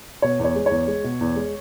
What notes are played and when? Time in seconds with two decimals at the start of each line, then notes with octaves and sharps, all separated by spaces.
0.22 B2 C#5
0.39 E2
0.44 C#5
0.56 G#3
0.66 E2 C#5
0.88 G#3
1.04 B2
1.21 E2
1.36 G#3